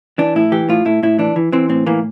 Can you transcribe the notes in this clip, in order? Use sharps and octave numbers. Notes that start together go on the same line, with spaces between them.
E3 D4
A2 E4
E3 G4
A2 F4
A2 E4
A2 E4
E3 D4
E3
E3 C4
A2 C4
E3 A#3